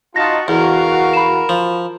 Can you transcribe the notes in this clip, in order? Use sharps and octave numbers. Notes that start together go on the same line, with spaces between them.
D#4 F4 F#4 A5 A#6
E2 F#4 A#4 F5
B5 E7
F3